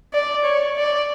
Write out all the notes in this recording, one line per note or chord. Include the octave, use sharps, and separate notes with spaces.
D5
C#5
D5